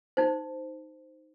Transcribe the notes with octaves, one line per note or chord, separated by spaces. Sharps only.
D#4 C5